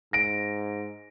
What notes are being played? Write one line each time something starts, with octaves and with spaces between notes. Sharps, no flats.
G#2 A#6 D7